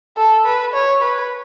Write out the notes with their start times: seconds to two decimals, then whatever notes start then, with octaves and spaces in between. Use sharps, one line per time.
0.17 A4
0.46 B4
0.74 C#5
1.02 B4